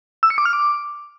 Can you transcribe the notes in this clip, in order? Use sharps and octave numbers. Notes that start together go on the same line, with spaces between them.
E6
C#7
D6
F6
D6